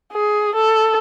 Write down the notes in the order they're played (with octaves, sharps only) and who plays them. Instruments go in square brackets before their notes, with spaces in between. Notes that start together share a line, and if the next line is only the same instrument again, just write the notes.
[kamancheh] G#4
A4